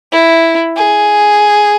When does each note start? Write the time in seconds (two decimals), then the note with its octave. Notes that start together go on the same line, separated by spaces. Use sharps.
0.12 E4
0.77 G#4